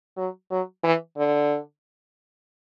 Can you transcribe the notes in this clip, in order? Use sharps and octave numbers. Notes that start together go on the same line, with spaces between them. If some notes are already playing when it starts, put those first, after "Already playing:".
F#3
F#3
E3
D3